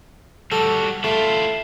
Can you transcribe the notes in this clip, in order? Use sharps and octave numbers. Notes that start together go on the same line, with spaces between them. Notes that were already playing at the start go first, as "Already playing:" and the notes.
G3 F#4 A4
A3 E4 F4